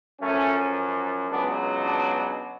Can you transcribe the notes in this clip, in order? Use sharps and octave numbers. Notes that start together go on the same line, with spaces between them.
F#2 F3 A3 C#4
C#2 B2 F#3 B3 D4
B3 D4